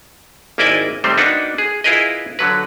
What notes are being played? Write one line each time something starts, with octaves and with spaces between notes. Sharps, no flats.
G#1 A#3 E4 D5 D#5 G#5
C3 D#3 G3 A3 C4 C5
A#3 D4 D#4 F#4 B4
G#4
E4 F4 G#4 A#4 B4 D#5
D3 F#3 B4